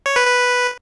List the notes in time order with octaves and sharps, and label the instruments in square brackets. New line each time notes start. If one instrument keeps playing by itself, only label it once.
[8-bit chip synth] C#5
B4
B4